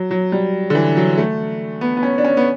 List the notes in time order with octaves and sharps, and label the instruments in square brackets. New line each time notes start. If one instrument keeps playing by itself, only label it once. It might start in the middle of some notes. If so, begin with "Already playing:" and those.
Already playing: [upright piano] F#3
F#3
G3
D3
E3
F#3
A3
B3
B3
C#4
D4
C#4
B3